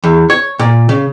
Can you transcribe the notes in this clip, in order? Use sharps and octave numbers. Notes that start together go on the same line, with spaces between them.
E2
C#5
A#2
C#3